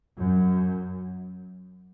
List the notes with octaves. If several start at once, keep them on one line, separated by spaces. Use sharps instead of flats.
F#2